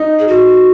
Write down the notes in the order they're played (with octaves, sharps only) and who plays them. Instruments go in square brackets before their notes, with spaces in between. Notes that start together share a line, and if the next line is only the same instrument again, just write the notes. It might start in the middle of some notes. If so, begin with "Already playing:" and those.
Already playing: [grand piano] D#4
[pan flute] G#4
F#4